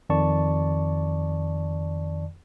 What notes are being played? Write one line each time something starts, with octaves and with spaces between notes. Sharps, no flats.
F2 D#3 D5 A5 C#6